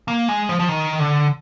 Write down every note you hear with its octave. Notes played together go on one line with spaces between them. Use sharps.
A#3
G#3
F3
F3
D#3
D3